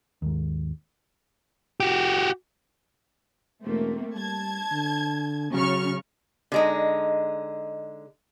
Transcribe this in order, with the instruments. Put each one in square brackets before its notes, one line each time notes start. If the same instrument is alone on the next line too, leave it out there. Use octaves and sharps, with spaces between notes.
[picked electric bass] D#2 G#2
[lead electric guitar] F#4 G4
[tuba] E1 [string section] A3 A#3 C4
[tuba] G3 [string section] A5 G#6
[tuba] D3
[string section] C#3 C#6 F6 [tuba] F#3
[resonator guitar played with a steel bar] D3 G#3 D#4